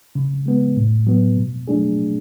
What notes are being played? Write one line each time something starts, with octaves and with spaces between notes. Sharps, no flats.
C#3
G#3 B3
A2
F#3 B3
B2
F#3 A3 D4 G#4